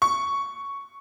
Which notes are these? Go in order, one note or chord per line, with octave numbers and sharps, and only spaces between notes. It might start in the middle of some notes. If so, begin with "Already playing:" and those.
C#6